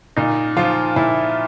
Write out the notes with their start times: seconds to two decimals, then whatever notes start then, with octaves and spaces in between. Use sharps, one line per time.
0.17 A#2 D#4
0.56 F3 F4
0.96 A#2 E4